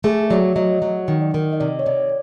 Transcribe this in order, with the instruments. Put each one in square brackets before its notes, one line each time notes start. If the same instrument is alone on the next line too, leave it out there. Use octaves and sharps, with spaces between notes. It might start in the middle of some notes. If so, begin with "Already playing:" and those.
[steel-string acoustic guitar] A3 [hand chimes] G#4
[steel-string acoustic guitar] F#3 [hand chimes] D5
[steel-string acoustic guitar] F#3 [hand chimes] D#5
[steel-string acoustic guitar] F#3
D#3
[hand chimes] D5
[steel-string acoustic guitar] D#3
[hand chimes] D#5
[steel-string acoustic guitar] C3 [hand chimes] D5
[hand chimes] C#5
[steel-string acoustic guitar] C3 [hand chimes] D5